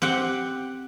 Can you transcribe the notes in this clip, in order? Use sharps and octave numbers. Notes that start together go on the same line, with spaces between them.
C4 G4 F#5